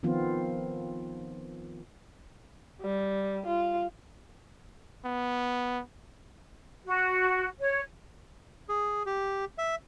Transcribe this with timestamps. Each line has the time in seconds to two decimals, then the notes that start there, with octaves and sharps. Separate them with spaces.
0.03 D#3 F3 B3 C4 F4
2.81 G3
3.46 F4
5.05 B3
6.85 F#4
7.59 C#5
8.69 G#4
9.06 G4
9.58 E5